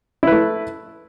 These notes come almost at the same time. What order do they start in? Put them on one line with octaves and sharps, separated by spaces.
E4 B4 A3